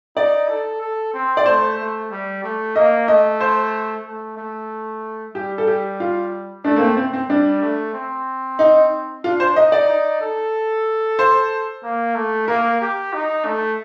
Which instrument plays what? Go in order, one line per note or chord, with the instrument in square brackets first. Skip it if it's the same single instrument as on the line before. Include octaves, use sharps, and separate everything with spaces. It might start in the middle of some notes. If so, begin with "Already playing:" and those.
[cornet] D#4 [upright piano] D5
[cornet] A4
A4
C4
[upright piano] D5
[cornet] A3 [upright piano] C5
[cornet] A3
G3
A3
[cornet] A#3 [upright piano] D#5
[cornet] A3 [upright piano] D#5
[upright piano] C5
[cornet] A3
A3
[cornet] G3 [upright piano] G4
[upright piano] A4
G4
F4
[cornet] A3 [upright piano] D4
[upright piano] A#3
C4
C4
C4
[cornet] G3 [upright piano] D4
[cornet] A3
C4
[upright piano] D#4
[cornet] D4 [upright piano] F4
[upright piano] C5
[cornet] D#4 [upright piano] D#5
[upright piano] D5
[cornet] D#4
A4
[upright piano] C5
[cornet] A#3
A3
[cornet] A#3 [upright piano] A#4
[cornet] G4
D#4
A3